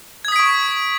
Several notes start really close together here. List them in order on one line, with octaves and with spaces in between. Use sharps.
G#6 D#6 B6 D7 C#6